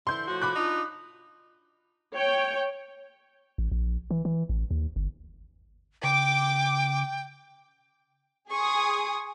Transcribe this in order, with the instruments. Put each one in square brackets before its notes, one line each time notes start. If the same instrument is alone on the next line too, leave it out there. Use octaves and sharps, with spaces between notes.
[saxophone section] D3 E3 E4 [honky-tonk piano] C6 G6
[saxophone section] A2 F3 F#4
[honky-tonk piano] B5 D6 F#6
[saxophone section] D4 D#4 F4
[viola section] C#5 G5
[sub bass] A1
A#1
E3
E3
A1
D#2
G1
[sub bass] C#3 [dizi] G5 [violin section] D6
[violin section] G#4 G#5 D#6 [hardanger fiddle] C6 C#6